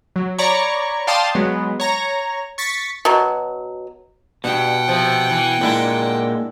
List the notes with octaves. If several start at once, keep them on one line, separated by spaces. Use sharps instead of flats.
F#3
C#5 D5 A#5 B5 C#6
D5 F5 G5 A5 C6 D#6
F#3 G#3 B3
C#5 A#5
C#6 A6 B6 C#7
B2 F#3
G2 B2 F#5 G5
C3 F3
E3
A#2 G#3 D4 E4